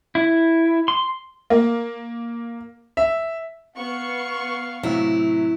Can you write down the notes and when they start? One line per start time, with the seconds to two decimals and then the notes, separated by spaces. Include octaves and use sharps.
0.15 E4
0.88 C6
1.50 A#3
2.97 E5
3.76 B3 F5 C#6
4.83 A2 C3 F#3 E4